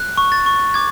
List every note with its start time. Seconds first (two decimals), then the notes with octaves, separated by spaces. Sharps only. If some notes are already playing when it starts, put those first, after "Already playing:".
Already playing: F#6
0.17 C#6
0.32 A6
0.46 C#6
0.74 D6 G#6